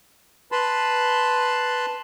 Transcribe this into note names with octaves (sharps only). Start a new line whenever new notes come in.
B4 A5 B5 C6